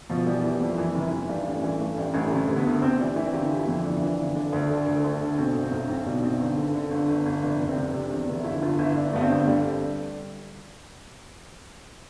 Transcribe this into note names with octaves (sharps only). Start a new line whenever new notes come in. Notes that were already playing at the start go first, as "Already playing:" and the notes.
B2 F3
E3 G3
E3
F2
E3
F1
E3
G2 G3
A1
A3
E3
G2 A3
A1 G3
A1 A3
C3 A3
D2
B3
D2
C3 C4
E3 D4
E3 E4
G1 G4
E3
E4
F2
G1 D4
E3
G1
D3 D4
D2
D3
D2
D2
D3
B2 C4
B1
C4
B1
B1 C4
B2 D4
B1 C4
G1
D3
D3
G1
G1
G1
F1 D4
F1
C4
C3
C3 D4
E2
F1
G1 E4
G1 F4
G1 E4
G1 D4
G2 B3
C4
G1
D3 G3